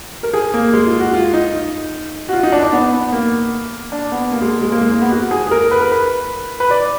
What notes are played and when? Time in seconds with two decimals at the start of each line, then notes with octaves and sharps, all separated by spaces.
0.23 A#4
0.33 G#4
0.54 A#3
0.73 G#3
0.87 F4
1.00 F#4
1.14 F4
1.33 D#4
2.29 F#4
2.33 F4
2.43 D#4
2.52 D4
2.63 D4
2.73 B3
2.92 B3
3.12 A#3
3.92 D4
4.12 B3
4.32 A#3
4.41 G#3
4.62 G#3
4.72 A#3
4.81 G#3
4.92 A#3
5.01 B3
5.11 F#4
5.31 G#4
5.47 G#4
5.51 A#4
5.71 B4
5.81 A#4
5.92 B4
6.60 B4
6.71 D5